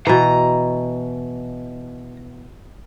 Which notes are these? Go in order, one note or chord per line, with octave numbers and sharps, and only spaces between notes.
B2 E3 A#5